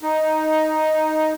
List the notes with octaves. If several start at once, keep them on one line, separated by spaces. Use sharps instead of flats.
D#4